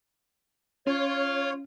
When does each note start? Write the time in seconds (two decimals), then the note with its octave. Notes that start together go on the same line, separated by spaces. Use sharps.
0.87 C#4 F4 C#5